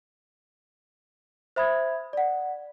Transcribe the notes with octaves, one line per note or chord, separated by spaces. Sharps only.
C5 E5 B5 D#6 G#6
D5 F#5